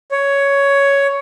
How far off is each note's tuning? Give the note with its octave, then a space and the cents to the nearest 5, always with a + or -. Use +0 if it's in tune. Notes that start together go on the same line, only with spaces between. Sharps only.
C#5 +10